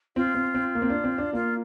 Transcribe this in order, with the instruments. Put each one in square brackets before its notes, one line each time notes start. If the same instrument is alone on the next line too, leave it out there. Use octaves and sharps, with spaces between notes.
[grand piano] C4 [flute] F4
[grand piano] C4
C4
A#3
C4
D4
C4
D4
[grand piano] A#3 [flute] F4